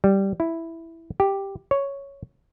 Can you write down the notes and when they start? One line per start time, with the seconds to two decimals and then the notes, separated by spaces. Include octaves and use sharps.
0.04 G3
0.40 E4
1.20 G4
1.71 C#5